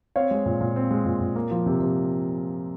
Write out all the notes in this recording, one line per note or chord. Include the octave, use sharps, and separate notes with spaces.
C4 C#5 F5
G#3
A#2
A#2
C4
G#3
A#2
A#2
A#3
F3
C3
C3